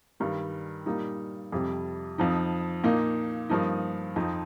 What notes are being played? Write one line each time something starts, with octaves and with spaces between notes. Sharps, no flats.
G2 D#3 G3
A#2 G3 A#3 D#4
F2 C3 G3
F2 F3 D#4
A#2 A#3 D#4
G2 F3 A#3 D#4
F2 F3 C4 D#4